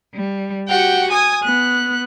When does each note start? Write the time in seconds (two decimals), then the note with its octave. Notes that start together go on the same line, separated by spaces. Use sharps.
0.13 G3
0.68 F#4 G4 F#5 G5
1.10 G#5 D#6 G#6
1.43 B3 F#6